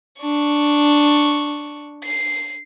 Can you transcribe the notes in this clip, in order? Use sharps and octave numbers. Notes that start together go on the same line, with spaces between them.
D4 C#6
C7